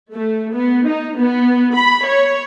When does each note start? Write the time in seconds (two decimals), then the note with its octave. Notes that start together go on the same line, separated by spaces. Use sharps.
0.13 A3
0.54 B3
0.87 D#4
1.18 B3
1.76 B5
2.06 C#5